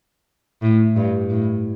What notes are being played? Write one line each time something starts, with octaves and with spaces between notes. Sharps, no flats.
A2
G2
A2